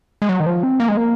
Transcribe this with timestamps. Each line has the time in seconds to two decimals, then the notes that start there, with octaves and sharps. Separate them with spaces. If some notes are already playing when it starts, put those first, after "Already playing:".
0.22 G#3
0.29 F#3
0.40 D#3
0.46 F3
0.63 C4
0.80 A#3
0.88 G#3
0.97 A#3